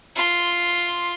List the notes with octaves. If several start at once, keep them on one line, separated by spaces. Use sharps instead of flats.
F4 C6